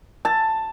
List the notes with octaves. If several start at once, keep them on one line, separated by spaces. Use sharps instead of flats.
A5